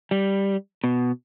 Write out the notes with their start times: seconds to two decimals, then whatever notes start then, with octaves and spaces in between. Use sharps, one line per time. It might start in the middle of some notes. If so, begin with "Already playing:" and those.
0.11 G3
0.84 B2